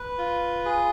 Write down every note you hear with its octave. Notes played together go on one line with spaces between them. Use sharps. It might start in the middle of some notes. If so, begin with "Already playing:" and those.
Already playing: B4
F4
G#4